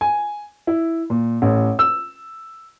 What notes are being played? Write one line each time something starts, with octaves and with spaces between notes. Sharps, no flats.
G#5
E4
A#2
A1
E6